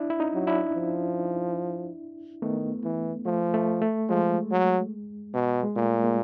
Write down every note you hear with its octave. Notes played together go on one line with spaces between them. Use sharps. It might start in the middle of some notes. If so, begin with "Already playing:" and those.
Already playing: D4 E4
E4
C#4 D#4
F#3
D4 E4
F3
D#3 A3 B3
E3
F3 A3
A3
A3
F3 G#3
F#3
B2
G#3
A#2 A3
G#3 A#3